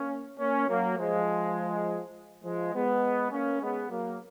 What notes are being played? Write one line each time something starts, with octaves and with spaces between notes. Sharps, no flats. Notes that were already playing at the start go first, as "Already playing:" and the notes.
Already playing: A#3 C#4
A#3 C#4
F#3 A#3
F3 G#3
F3 G#3
G#3 B3
A#3 C#4
G#3 B3
F#3 A#3